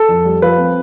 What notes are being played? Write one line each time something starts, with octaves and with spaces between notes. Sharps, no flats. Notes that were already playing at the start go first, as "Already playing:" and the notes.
Already playing: A4
F2
G3
F3 B4
C4